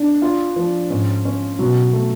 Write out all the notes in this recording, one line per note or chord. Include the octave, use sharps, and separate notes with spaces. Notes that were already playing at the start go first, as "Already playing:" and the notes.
Already playing: D4
F4
F3
G#2 C#4
C#4
B2 F#3
A3